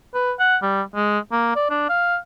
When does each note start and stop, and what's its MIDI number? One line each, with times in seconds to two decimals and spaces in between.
0.14 0.33 71
0.40 0.57 78
0.62 0.82 55
0.95 1.19 56
1.32 1.53 58
1.55 1.66 74
1.70 1.86 62
1.89 2.17 77